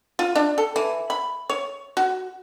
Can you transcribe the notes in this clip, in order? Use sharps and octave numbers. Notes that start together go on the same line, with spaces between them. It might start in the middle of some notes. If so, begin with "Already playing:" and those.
F4
D4
A4
E3
B5
C#5
F#4